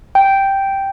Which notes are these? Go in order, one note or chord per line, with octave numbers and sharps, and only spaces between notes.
G5